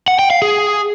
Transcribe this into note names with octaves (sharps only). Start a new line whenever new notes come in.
F#5
G5
F5
G#4